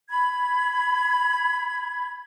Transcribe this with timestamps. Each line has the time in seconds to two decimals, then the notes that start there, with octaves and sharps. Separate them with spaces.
0.09 B5 G#6